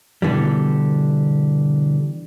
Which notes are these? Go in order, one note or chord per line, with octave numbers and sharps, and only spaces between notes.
B2 D3 E3 G3